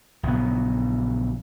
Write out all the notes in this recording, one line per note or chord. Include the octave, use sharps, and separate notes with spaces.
A#1 C#3 F#3 B3